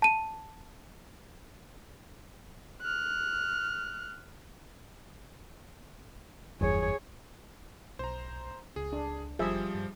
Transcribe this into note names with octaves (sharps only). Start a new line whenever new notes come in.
A5 D#7
F6 F#6
F#1 E2 G2 G#4 C#5
B1 C5 A#5
C#2 G#4
D4
F#1 F3 G3 G#4 E5
G2